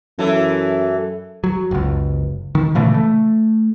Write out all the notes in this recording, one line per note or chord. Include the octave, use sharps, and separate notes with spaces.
F#2 E3 A4
F#3
F#1 C#2
D#3
A#2 C#3 E3 A3
A3